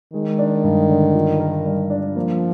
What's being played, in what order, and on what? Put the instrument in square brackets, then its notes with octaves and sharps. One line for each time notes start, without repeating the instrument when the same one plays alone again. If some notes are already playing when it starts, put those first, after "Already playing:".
[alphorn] D#3 [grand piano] G#3
[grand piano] D4
G2
D3
F4
A#4
G3
D4
[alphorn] F3 [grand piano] A#3